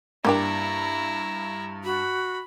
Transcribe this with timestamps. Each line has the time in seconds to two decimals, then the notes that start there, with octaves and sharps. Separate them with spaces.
0.25 G2 A#3 D4 E4 G4 A#5
1.84 F#4 B5